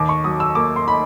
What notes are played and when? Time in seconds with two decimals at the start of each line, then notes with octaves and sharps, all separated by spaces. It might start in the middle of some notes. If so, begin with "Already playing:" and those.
Already playing: D#2 D6
0.09 C#6
0.24 F#3 D#6
0.40 E6
0.55 A#3 D6
0.76 C6
0.87 D#3 B5